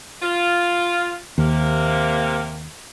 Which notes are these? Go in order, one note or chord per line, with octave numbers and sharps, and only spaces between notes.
F4
D#2 C3 A#3